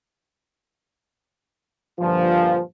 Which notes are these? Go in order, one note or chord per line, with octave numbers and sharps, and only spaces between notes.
G2 A#2 D3 F3